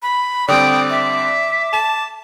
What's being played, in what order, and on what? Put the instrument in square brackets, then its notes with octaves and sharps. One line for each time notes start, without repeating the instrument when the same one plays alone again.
[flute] B5
[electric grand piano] D3 G3 C4 [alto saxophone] D5 [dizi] G5 [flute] D#6
[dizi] E5 [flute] D6
[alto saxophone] A5 [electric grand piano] E7